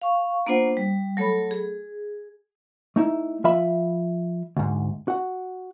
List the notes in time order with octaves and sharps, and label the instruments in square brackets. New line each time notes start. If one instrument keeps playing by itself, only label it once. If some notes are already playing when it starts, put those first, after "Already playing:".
[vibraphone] F5 C#6
A#3 B3 D4 F4 C5 F#5
G3
F#3 A3 A4 C#5 B5
G#4
[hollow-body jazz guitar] A3 D#4 E4
F3 F4 E5 B5
D2 G#2
F#4 F#5